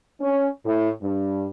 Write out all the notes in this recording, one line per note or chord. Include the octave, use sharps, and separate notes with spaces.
C#4
A2
G2